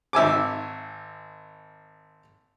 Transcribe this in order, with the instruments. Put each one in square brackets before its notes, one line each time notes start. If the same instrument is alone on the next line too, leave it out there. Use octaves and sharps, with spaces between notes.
[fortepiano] G#1 E5 G#5 D6